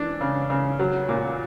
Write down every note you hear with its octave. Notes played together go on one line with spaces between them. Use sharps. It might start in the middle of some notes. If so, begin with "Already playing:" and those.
Already playing: E3 D4
C#3
C#3
F#3
A#2